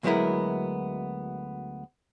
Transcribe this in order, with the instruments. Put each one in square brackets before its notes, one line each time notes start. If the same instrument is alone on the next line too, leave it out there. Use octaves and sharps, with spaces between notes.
[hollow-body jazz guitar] D2 F#3 G#3 B3 E4 A#4